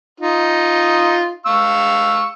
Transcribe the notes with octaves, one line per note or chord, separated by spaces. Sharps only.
D#4 F4
F5 C#6 E6